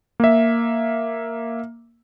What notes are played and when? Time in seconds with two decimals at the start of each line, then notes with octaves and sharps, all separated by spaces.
0.20 A#3 E5